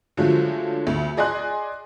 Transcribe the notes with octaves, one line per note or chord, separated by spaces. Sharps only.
D3 F3 F#3 G#3 A3
D2
G#4 D5 D#5 G#5 C6 F#6